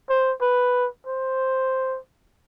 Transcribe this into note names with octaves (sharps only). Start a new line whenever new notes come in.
C5
B4
C5